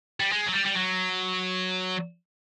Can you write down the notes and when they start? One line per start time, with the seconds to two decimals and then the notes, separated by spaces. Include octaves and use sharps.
0.20 G3
0.32 G#3
0.47 F#3
0.53 G3
0.66 G3
0.75 F#3